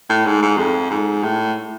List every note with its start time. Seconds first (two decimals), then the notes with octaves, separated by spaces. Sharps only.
0.10 A2
0.26 G#2
0.42 G#2
0.58 F2
0.91 G#2
1.23 A2